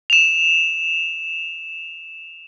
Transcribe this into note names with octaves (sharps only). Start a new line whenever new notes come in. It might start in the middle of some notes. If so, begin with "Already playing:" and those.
E7 F7